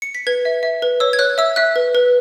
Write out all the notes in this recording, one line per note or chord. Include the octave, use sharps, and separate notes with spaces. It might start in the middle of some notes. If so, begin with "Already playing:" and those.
C#7
B6
B4 G#6
E5
E5
B4
C#5 E6
G#6
C#5 F#6
E5 E6
E5 F#6
B4
B4